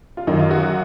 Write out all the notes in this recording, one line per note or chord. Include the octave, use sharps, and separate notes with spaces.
F4
F#2 D#3 D#4
F4
F#4